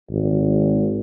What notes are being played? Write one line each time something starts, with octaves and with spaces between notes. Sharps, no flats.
G#1